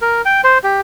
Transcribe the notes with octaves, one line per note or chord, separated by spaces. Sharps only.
A#4
G5
C5
G4